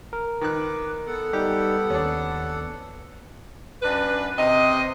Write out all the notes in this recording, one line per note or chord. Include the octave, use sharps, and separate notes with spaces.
A#4
D#3 B4 D6 F#6
B3 A4 F#5
G3 D#4 G4
D#2 C#4 D4
F#2 D4 B4
C3 D#5